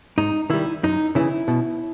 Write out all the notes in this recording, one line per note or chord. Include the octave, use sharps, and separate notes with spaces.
G#2 D#4
D#3 G3 E4
F#2 D#4
C#3 E3 E4
B2